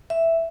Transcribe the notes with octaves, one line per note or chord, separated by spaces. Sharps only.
E5